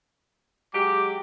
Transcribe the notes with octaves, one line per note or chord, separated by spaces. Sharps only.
F#3 G#3 G4 D6